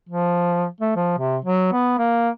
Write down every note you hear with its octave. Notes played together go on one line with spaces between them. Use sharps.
F3
A3
F3
C3
F#3
B3
A#3